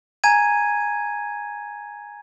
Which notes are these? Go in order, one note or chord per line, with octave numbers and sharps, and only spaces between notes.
G#5 A#5 G#6 D#7